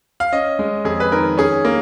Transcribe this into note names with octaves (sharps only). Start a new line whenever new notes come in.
F5
C#4 D#5
G#3
F2 G#4
B4
D#3 A#4
C#4 G#4
A#3